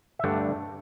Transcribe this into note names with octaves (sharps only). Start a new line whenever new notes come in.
E5
G2 D3 A3 D4 F#5